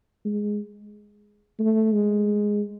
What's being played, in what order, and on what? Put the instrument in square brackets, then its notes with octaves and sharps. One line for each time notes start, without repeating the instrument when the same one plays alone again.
[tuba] G#3
A3
G#3